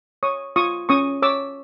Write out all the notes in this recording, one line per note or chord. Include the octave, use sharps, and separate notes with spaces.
C#5 C#6 D#6
F4 C#6 D#6
C#4 C#6 D#6
C#5 D6 E6